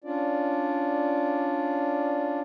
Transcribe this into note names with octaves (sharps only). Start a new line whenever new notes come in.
C#4 D4 F4 D5